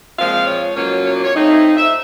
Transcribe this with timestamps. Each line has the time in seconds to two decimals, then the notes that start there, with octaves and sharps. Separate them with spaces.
0.17 A#2 F3 G#3 C4 F5
0.47 C#5
0.75 B2 F#3 A#3 C#4 F4 C#5
1.04 C#5
1.15 D5
1.24 C#5
1.34 F3 A3 C4 D#4
1.48 E5
1.63 F5
1.77 E5